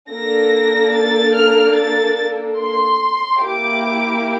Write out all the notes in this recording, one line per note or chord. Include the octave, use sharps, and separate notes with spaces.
A#3 D4 A4 A#6
A6
F6
A6
C6
A#3 E4 G4 D6